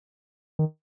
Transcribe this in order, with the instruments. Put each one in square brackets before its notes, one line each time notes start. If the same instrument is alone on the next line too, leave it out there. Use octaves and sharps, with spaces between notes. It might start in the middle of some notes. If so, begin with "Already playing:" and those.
[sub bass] D#3